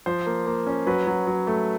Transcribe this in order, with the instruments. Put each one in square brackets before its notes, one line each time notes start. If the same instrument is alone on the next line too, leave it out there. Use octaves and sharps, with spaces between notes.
[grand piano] F3 C5
A#3
A#3
C#4
F#3 B4
F#3
F#3
A3